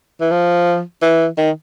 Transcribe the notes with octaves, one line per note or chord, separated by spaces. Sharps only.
E3
F3
E3
D#3